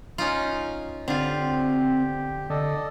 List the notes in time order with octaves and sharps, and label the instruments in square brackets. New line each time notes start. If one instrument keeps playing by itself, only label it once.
[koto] C#4 D#4 F4
[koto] D3 F4 [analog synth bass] C4 [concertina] G4
[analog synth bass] D3 [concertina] A4 D5 D#5